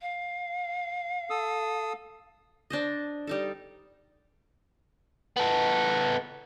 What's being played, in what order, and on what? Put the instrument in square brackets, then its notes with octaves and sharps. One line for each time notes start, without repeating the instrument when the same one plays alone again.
[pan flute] F5
[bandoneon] A4 D#6 E6
[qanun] D4 C5 D#5
G3 D#4 A4
[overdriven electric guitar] B3 A4